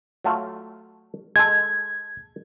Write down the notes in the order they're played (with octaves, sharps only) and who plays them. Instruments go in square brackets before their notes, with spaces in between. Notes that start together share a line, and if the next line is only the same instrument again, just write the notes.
[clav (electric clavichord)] F#3 A3 F4
[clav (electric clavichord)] G#3 A4 [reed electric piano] G#6